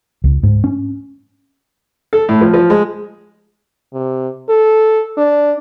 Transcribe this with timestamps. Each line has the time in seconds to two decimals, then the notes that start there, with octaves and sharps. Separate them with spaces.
0.24 C#2
0.43 G#2
0.64 C#4
2.13 A4
2.29 A2
2.41 F3
2.54 F3
2.70 G#3
3.93 C3
4.50 A4
5.17 D4